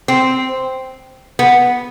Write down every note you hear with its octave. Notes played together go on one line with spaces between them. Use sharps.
C4
B3